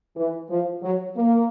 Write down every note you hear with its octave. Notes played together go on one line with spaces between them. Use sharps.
E3
F3
F#3
A#3